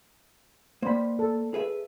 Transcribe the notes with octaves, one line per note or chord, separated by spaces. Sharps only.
A#3 C5 D5 B5
A4
G#4 B4 E5